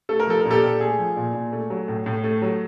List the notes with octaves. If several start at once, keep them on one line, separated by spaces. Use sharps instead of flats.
A3 A4
A#4
F3 A4
A#4
A#2
G4 A4
A#2
A3 G#4
F3
A#2
A#2
A3
F#3
A2
A2
A3
F#3